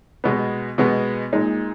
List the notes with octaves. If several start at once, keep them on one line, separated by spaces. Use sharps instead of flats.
B2 G#3 B3
B2 G#3 B3
A#2 G#3 D#4